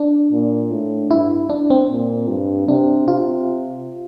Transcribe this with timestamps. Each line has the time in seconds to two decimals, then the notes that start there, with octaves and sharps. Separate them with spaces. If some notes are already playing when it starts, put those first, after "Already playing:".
Already playing: D4
0.32 A#2
0.71 A2
1.11 G2 E4
1.50 D4
1.70 C4
1.90 A#2
2.28 G2
2.68 C3 D4
3.08 C3 F4